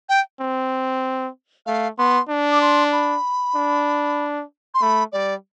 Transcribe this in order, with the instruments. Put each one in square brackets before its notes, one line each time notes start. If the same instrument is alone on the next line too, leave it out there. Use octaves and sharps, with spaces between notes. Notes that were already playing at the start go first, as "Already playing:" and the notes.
[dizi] G5
[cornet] C4
[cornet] A3 [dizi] F5
[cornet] B3 [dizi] C6
[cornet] D4
[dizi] D6
C6
B5
[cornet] D4
[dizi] C6
[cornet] A3 [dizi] B5
[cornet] G3 [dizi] D5